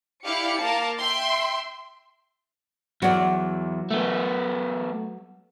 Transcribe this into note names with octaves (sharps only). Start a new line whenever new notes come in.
E4 G4 D5 F5 C#7
A#3 A#4 F5 A5
E5 G5 C6
E2 F#3 D5
A3 B3